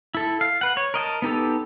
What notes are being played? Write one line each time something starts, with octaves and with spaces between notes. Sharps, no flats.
E4 A4
F5
B4 F#5
C#5
A#4 D#5 F#5 A5
B3 D#4 G4 A4